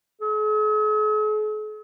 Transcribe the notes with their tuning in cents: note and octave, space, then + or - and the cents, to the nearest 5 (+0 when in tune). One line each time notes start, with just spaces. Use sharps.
G#4 +45